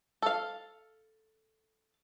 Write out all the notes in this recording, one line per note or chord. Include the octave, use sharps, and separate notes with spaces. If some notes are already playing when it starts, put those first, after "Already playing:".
A4 F5